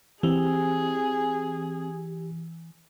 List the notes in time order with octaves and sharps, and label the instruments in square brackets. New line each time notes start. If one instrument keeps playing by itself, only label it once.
[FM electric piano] E3 [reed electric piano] C4 [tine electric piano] G4 [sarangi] G#4